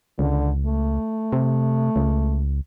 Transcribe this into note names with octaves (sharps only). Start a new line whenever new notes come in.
C#2 D3
A3
C3
C#2